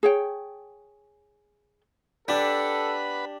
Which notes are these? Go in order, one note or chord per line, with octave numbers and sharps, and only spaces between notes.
G#4 C#5 G5
D4 G4 A4 B4 F#5 B5